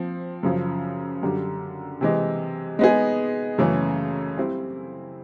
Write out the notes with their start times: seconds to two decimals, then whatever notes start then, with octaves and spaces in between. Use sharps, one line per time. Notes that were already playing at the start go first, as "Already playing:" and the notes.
Already playing: F3 C4
0.43 F#2 C#3 F3
1.23 F#2 D3 G3
2.01 C3 E3 G#3
2.79 G#3 B3 D#4 G#4
3.58 F#2 C#3 E3 A3 C#4
4.37 G3 C4 E4